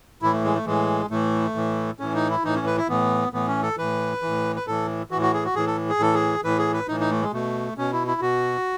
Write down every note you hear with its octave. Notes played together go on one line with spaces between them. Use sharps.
A2 E3 E4
A3
G#3
A3
A2 E3 G#3
A2 E3 A3
A2 E3
A2 E3 C#4
D#4
E4
A2 E3 D#4
C#4
B4
E4
A2 E3 B3
A2 E3 B3
C#4
A4
A2 E3 B4
A2 E3
B4
A2 E3 A4
A2 E3 F#4
F#4
G#4
F#4
A2 E3 G#4
A4
G#4
A2 E3 A4
G#4
A2 E3 B4
G#4
B4
A2 E3 D#4
D#4
A3
G#3
B2 A3
B2 C#4
E4
E4
B2 F#4